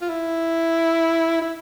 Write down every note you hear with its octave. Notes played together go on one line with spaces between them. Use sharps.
F4
E4
E4